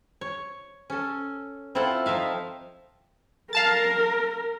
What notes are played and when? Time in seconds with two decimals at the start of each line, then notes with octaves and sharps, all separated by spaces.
0.21 C#5
0.90 C#4 A4
1.75 C4 E4 F4 A4 F#5
2.06 F3 D#4 E5 F5
3.53 A#4 F5 A5 A6